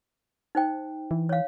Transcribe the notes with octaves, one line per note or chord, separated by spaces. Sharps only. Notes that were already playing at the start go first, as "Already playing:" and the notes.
D#4 C5 G5
E3
C#5 F5